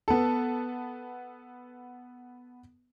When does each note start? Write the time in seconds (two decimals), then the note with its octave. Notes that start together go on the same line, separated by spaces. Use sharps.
0.08 B3 A4